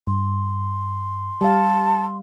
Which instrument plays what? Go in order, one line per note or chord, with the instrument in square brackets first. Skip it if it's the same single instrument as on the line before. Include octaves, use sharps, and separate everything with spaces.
[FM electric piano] G2 [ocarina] C6
[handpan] G3 F5 [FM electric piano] G4 [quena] A5